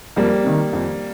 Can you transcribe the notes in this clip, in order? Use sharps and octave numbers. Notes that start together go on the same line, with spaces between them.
F2 G3 A#3
C3 D#3
F2